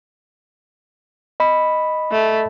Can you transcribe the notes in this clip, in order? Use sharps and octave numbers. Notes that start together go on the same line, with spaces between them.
D#5 B5
A3